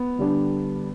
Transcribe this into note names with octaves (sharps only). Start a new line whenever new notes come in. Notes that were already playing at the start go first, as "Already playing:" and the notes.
Already playing: B3
D3 G3 D4